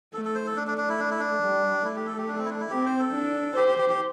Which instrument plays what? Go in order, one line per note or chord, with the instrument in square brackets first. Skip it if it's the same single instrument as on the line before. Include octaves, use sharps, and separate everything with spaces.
[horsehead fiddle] A3 [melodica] A4
[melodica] A4
C5
A4
[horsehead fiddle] A3 [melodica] D4
[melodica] D4
D4
E4
D4
E4
D4
[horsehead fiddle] G3
[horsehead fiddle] A3 [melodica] E4
[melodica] G4
A4
G4
D4
C4
E4
D4
E4
[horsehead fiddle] C4 [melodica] G4
[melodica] C5
A4
[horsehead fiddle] D4
[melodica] G4 [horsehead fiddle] C5
[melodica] G4
G4
G4